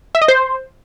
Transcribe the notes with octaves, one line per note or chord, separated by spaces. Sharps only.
E5
D#5
C5